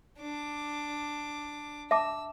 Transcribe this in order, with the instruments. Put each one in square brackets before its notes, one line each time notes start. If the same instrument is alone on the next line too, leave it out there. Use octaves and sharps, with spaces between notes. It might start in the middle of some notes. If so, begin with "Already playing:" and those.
[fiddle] D4 D6
[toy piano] E5 A5 D6 [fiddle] E6